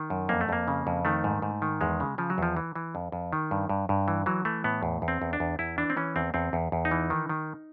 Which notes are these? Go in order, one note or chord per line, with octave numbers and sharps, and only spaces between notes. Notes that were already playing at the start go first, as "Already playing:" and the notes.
Already playing: D#3
F#2
F2 A#3
A3
F2 A#3
C#3
F2
D#3 A3
G#2
G#2
D#3
E2 G#3
C#3
C#3 F3
F#3
E2 F3
E3
E3
F2
F2
D#3
G2
G2
G2
E3
E3 F#3
E3 A3
A2 B3
E2
E2
C4
E2
D4
E2
E2 E4
E3 D4
C4
E3 C#4
E2 C4
E2 C4
E2
E2
D#4
E3
D#3
D#3